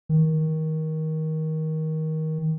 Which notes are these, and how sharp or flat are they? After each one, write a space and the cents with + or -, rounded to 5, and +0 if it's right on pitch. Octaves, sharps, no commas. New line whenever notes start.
D#3 +20